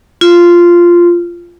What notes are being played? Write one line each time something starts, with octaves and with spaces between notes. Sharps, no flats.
F4